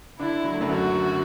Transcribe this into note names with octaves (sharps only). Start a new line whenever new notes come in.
D3 D4 E4
F#3
A3
F#2 F#3
D2 D3 F#4